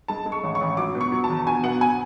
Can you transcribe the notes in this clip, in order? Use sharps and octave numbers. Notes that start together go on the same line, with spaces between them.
G#3 A5
G#3
C#6
A1
C#6
A1
F#3 D6
B2
C#6
F#3
A5
E2
B2 G#5
B2 F#5
G#5